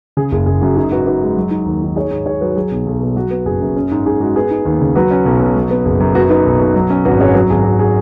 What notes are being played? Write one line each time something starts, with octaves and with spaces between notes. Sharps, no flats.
C#3 G#4
F#1 G#4
F#1 G#4
F#2 F#4
D#4 G#4
G#2 F#4 B4
G#2 F#4 B4
G#3
F#3
D#4
D#2
D#3
D#4 G#4 C#5
G#2
G#2 G#4 C#5
F#3 F#4 B4
F#3 G#4
B1
B1
B2
F#3 F#4
B3
F#1 G#4
F#2
C#4
G#2
G#2 G#4
G#3 F#4
B3 G#4
D#4
D#2
C#3
F#3 F#4 B4
C#4
B1
B2
F#3
B3
F#1
F#2
B3 F#4
D#4 F#4 B4
B1
B2
F#3
C#4
G#1 F#4 B4
F#2 G#4 C#5
F#3 F#4 B4
G#1 G#4
G#1 F#4
G#4